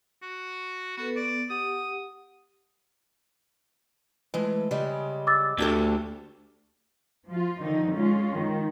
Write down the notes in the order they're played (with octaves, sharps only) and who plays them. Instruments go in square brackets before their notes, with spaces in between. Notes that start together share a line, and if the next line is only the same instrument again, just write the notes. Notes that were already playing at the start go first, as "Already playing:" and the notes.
[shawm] F#4
[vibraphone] B3 A4 B4 [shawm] F#4
[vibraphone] B3 [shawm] D5
[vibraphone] G4 F#5 [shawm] D#6
[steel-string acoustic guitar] E3 G#3 A3
C#3 G3 G#3
[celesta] D6 E6 A6
[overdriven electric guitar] D2 [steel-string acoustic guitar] D4 G4 A4
[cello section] F3 F4
D3 D#3 F3 D#4
G#3 C#4 F4
D#3